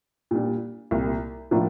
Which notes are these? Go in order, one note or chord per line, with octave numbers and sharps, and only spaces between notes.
A#2 G3 D4
C2 A#2 G3
A2 F3 A#3 D4